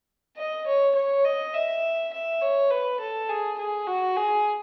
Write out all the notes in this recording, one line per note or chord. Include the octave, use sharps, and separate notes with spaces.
D#5
C#5
C#5
D#5
E5
E5
C#5
B4
A4
G#4
G#4
F#4
G#4